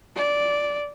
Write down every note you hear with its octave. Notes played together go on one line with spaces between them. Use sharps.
D5